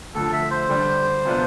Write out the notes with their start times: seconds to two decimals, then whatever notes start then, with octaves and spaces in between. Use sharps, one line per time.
0.15 D2 D3 F3 A4
0.32 E5
0.51 C5
0.69 D3 G3 D4
1.25 C3 F3 B3 D4 F4